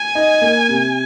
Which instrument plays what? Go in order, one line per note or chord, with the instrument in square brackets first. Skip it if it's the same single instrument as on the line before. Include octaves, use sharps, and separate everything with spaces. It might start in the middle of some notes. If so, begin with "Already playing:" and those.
Already playing: [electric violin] G#5
[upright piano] D#4
A#3
C3